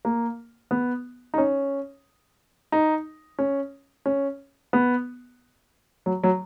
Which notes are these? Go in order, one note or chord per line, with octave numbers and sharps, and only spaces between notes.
A#3
B3
D#4
C#4
D#4
C#4
C#4
B3
F#3
F#3